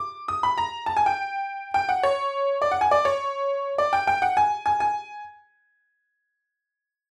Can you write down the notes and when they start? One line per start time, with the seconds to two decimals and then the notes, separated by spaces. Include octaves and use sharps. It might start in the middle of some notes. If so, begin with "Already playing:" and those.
Already playing: D6
0.28 D#6
0.43 B5
0.58 A#5
0.86 A5
0.97 G#5
1.06 G5
1.74 G5
1.89 F#5
2.03 C#5
2.62 D5
2.71 F#5
2.81 G#5
2.91 D5
3.05 C#5
3.78 D5
3.93 G5
4.07 G5
4.22 F#5
4.37 G#5
4.66 G#5
4.80 G#5